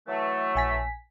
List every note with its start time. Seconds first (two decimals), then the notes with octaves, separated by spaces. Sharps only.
0.07 E3 F#3 A3
0.55 A#1 G#5 B6